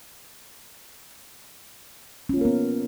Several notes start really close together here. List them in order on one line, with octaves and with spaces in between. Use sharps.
C#4 F4 A#3 A#4 B3